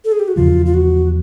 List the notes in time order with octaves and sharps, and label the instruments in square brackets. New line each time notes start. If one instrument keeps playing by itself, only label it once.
[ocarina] A4
G#4
G4
F#4
[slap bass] E2 C#3 F3 A3 [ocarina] F4
[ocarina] F4
F#4